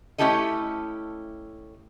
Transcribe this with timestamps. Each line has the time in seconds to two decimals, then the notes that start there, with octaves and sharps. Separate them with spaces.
0.18 A3 C#4 E4 G4 A4 D#5